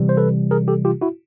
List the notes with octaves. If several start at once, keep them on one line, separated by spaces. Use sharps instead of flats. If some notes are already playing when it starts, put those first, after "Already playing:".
Already playing: C3 E3 G3
C5
A4 B4
G#4 A#4
G4 A4
F4 G4
E4 F#4